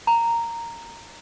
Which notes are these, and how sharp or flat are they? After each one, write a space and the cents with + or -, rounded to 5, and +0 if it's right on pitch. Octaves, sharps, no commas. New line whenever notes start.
A#5 -10